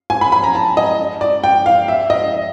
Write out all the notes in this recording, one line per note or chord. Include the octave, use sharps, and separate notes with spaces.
G#5
B5
B5
A#5
A5
D#5
D5
G5
F5
E5
D#5